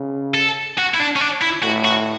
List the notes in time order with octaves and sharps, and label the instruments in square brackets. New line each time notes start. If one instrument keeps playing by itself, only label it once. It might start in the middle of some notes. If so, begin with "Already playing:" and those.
Already playing: [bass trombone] C#3
[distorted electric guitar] A4
F#4
E4
D4
C#4
D4
E4
[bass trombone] A2 [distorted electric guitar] F#4
[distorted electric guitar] F#4